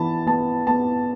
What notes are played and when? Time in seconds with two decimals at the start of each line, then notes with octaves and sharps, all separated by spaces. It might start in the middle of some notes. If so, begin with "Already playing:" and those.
Already playing: E3 B3 A5 B5
0.27 B3 A5
0.67 B3 A5